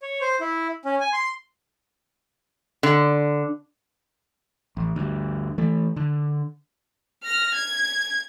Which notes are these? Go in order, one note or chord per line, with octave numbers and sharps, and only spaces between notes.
C#5
C5
E4
C#4
G#5
C6
D3
A1
D2 G2
E3 A3
D3
F6 A#6
G#6